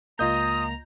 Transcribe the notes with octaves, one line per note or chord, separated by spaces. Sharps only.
C#2 A#3 F4 D#5 A#5 D#6 G6